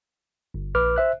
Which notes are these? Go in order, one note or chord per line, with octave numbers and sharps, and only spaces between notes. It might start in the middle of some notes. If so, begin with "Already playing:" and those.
G1
A#1 B4 D6 F6
C5 E5 F#6